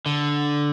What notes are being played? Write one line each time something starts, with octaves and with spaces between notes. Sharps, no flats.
D3